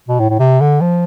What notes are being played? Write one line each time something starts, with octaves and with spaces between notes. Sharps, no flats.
B2
A2
A2
C3
D3
F3